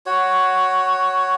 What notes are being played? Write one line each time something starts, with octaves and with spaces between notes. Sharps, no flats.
F#4 C#5